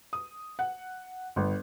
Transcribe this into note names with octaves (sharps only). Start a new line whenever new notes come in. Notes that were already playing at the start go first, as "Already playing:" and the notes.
D#6
F#5
G1